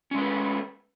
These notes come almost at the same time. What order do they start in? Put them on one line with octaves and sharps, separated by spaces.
C#4 G#3 B4 A3